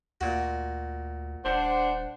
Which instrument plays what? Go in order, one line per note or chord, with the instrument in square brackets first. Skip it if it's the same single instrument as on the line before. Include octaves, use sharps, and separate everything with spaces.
[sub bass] D2 [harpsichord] A#2 F#4
[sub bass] D#1 [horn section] D4 C5 [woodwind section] F#5